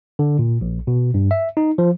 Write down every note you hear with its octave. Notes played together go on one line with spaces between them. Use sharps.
D3
A#2
A#1
B2
G2
E5
D#4
F3